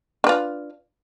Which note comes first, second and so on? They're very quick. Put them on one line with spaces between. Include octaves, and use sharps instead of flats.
D4 B4 F4